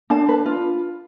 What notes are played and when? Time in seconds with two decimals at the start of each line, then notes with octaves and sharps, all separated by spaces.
0.10 D4 A5
0.29 B4
0.46 F4